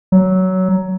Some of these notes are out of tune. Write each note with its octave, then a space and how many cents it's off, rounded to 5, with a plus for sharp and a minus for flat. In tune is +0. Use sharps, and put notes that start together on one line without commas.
F#3 +15